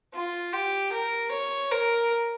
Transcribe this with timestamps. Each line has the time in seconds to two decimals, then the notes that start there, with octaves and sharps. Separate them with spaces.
0.14 F4
0.52 G4
0.93 A#4
1.31 C#5
1.71 A#4